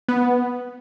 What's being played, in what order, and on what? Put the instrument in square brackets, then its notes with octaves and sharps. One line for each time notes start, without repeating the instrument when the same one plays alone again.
[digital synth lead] B3